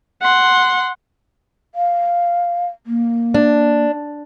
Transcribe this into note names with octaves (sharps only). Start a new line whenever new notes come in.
F#5 C6
F5
A#3
D4